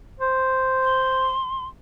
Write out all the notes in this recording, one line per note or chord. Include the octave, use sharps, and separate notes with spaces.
C5
C6